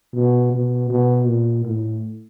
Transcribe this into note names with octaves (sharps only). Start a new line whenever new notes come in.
B2
B2
B2
A#2
A2